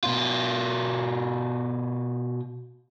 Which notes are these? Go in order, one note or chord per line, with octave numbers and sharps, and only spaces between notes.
B2 F4